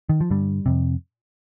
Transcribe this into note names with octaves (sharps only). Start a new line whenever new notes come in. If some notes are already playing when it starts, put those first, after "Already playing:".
D#3
F3
G2 D3 G3
F2 C3